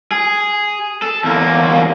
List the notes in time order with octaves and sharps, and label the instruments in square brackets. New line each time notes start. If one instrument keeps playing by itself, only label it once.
[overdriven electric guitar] G#4
A4
E2 A#3